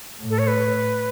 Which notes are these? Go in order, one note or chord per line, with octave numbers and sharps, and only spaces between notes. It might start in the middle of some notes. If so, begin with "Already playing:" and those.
A2
A4
C#5
B4